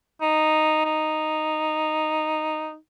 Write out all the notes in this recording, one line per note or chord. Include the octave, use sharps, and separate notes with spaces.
D#4
D#4